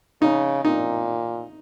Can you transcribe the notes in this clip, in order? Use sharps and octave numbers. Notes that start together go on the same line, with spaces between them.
C#3 D#4
A#2 D#4